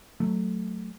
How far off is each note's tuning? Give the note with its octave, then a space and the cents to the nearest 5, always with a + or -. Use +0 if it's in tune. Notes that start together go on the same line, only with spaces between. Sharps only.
F#3 +0 A3 +0